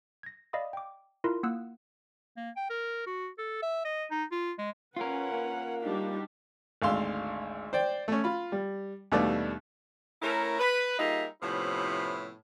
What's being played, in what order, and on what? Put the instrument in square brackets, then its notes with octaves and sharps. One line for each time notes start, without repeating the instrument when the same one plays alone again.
[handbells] G#6 A#6
D5 D#5 F5 B5 D#6
G5 D6
E4 F4 A#4 C6
A#3 F#5 E6 F#6
[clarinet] A#3
G5
A#4
F#4
A4
E5
D#5
D#4
F4
G#3
[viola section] C#4 B4 [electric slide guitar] F4 A#4 [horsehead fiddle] F#5
[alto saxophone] A#3
[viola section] G3 D4 F#4 [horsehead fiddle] D#4 G4
[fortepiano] G#1 D2 F5 C6 E6
C5 D5 G5
A3 C#4
F4 B5
G3
D#2 B2 G3 A3 B3 D4
[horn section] A3 C#4 E4 A#4
B4
G3 A#3 D#4 F4 G#4 E5
A2 C3 F3 B3 C#4 E4